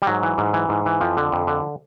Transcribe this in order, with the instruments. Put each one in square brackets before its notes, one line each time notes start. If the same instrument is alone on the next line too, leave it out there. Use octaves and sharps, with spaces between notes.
[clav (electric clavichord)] G3
G#2 F#3
E3
G#2
E3
G#2
E3
F2 F3
D3
F2
D3